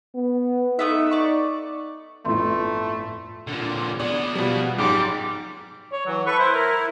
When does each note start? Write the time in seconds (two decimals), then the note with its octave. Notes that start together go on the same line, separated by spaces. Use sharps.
0.15 B3
0.79 A3 B3 D#4 E5
1.11 D5 C#6
2.25 G1 F2 A2 A3 E4 F4 C6
3.48 A#2 D3
4.00 B3 G#4 D5
4.35 B2 F3 G3
4.78 F#1 G#2 G3 G#4 D6
5.92 C#5
6.07 E3 F#3
6.27 A4 B4 C#6
6.39 E4 C5
6.54 A#4